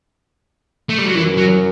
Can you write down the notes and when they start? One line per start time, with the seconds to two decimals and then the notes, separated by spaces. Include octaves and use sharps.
0.89 A3
0.98 G3
1.06 F#3
1.15 F#2 E3
1.37 F#3